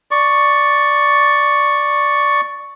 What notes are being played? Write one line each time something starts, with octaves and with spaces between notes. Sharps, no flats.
D5 C#6